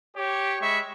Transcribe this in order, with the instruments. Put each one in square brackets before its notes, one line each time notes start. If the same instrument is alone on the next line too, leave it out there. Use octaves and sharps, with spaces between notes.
[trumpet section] G4 C#5
G#3 E5 B5 C#6